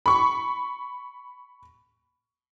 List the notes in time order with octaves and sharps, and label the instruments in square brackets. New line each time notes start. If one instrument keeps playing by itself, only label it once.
[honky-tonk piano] B5 C#6